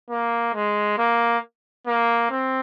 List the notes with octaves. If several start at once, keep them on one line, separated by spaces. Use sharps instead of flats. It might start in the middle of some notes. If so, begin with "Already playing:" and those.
A#3
G#3
A#3
A#3
C4